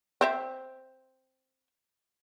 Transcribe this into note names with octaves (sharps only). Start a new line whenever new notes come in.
C4 C5 E5